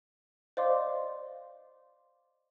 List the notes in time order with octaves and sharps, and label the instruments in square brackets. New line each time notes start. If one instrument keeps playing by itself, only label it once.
[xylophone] C5 D5 D#5 F5 C6 D6